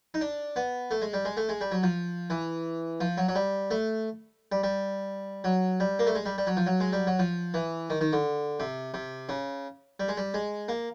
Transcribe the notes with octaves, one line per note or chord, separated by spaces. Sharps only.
D#4
D4
B3
A3
G#3
G3
G#3
A3
G#3
G3
F#3
F3
E3
F3
F#3
F#3
G3
A3
G3
G3
F#3
G3
A#3
A3
G#3
G3
G3
F#3
F3
F#3
G#3
G3
F#3
F3
E3
D#3
D#3
D3
C3
C3
C#3
G3
G#3
G3
G#3
A#3